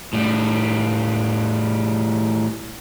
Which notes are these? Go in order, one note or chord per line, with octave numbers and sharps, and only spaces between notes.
A2 G3